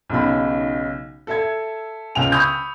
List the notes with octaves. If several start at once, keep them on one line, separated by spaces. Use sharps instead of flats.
B1 C#3 D#4 B5
A4 E5 G#6
C#2 C#3 G5 F7
B5 C#6 D#6 E6 G6